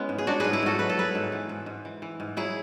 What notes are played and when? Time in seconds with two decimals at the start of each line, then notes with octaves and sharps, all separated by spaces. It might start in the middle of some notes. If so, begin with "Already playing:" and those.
Already playing: G#3 B3 C#4 E4
0.09 G#2
0.18 G#4
0.27 F#3 D4 F#4
0.40 G#2 G#4 B4
0.53 E4 G#4
0.63 G#2 F#4 A4
0.79 F#3 B4
0.89 A4
0.97 F#3 G#4 B4
1.15 G#2
1.32 E3
1.49 G#2
1.66 G#2
1.85 E3
2.02 E3
2.20 G#2
2.37 F#3 E4 G#4